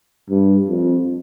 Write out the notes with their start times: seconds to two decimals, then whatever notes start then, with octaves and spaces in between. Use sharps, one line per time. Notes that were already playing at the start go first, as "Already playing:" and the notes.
0.29 G2
0.68 F2